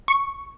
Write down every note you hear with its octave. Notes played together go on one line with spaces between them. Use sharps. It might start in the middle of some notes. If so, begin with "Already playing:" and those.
C#6